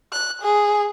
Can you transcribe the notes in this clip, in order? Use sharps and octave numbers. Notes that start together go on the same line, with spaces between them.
F#6
G#4